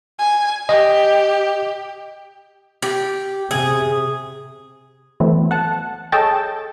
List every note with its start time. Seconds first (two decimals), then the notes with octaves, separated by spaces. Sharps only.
0.19 G#5
0.69 G4 D#5
2.82 G4
3.51 C3 G#4
5.20 E3 F#3 A3 B3 C4 E4
5.51 F#5 A5
6.12 G#4 A4 C#5 D#5 G5 A5